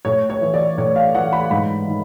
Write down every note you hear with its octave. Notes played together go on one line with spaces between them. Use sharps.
A2 C#5
C#5
E3
D5
A2 C#5
F5
E3 F#5
B5
G#2 B5
D#3